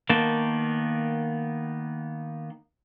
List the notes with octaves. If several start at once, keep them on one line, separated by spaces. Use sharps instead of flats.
D#3 A#3 B3 A5